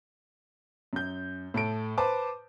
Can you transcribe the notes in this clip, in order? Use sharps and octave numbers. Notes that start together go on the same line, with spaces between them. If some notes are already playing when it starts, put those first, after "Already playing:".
F#2 G6
A2 A4 D7
B4 C5 A5 D6